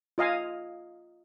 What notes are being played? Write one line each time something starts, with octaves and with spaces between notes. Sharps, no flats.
F4 D#5 F5 G#5